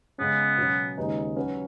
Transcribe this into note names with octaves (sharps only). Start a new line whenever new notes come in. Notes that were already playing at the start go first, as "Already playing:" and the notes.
C#3 G#3 B3 C#4
B2 F#3 C#4
D#2 C#3 G#3 D#4 B4
F#3 C#4 F#4 B4